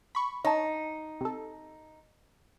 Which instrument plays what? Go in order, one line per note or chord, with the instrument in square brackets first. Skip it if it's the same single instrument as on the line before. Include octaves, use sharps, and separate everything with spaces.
[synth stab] B5 C#6
[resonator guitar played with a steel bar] D#4 [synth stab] C#5 A5
[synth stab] C3 A4